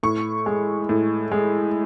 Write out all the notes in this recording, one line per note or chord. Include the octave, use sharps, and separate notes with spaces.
A2 C#6
G#3
A2
G#3